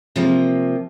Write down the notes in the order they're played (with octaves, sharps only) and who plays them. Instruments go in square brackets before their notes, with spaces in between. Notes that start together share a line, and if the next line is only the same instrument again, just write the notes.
[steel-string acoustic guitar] C3 F3 A#3